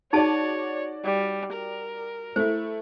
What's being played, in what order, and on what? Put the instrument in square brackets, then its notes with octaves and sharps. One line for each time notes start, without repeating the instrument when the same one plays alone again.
[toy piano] D#4 G#4 A5 [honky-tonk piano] F#4 D5 [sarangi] C#5
[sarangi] G3
A#4
[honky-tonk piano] A3 E4 [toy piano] C5